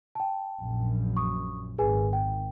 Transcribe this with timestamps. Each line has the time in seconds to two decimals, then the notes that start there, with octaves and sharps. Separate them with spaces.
0.15 G5 A5
0.59 A#1 F#2
1.17 C#6 D#6
1.78 G#1 G#4 B4 G#5
2.13 G5